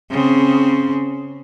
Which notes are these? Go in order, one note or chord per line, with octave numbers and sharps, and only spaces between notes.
C#3 C4